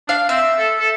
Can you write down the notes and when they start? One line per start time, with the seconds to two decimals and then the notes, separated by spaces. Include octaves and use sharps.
0.09 D4 F5
0.29 C4 E5
0.59 A4
0.80 A4